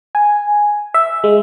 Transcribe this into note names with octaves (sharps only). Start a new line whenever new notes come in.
G#5
E5
G#3